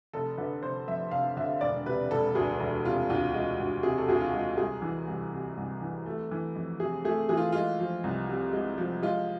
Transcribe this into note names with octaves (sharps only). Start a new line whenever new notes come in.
F1 A4
D3 B4
F1 C5
F2 E5
F1 F5
D3 E5
E1 D5
C3 B4
E1 A4
D2 G#4
E1
C3 F4
D2 F4
G#3
D2
C3 G#4
A4
D2 G#4
F4
G#3
C2 G#4
E3
C2
C3
C2
E3
A3
E3
F2
C3 G#4
A3 G#4
E3 G#4
F4
G#3 F4
F3
C2
C3
G#3
F3
G#3 F4